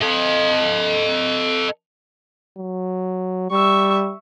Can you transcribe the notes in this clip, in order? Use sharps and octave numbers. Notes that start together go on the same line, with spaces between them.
A4 D#5
F#3
G3 E5 C#6